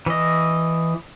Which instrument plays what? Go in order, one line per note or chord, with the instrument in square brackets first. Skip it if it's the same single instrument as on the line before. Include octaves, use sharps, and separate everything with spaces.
[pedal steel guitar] E3 D#5